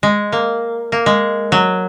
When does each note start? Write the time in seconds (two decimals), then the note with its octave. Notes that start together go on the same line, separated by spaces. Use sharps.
0.03 G#3
0.32 A#3
0.92 A#3
1.06 G#3
1.52 F#3